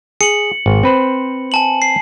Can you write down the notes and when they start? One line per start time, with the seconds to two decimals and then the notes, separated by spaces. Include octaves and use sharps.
0.21 G#4 C#7 F#7
0.66 G#1
0.83 C4 B4 C5
1.52 G#5 A5 F#7
1.82 C7